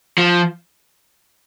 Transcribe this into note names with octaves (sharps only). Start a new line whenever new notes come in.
F3